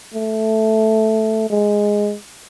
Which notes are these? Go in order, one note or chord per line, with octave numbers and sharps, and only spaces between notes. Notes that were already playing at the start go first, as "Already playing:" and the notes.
A3
G#3